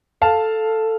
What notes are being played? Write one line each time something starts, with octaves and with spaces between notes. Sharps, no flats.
A4 F5 A5